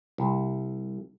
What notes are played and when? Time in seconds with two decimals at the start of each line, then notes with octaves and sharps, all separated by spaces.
0.18 C2